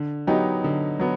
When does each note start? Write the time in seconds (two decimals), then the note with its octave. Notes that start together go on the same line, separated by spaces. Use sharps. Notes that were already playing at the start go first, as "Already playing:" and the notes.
Already playing: D3
0.27 F#3 B3 D#4 G4
0.64 D3
1.00 F#3 B3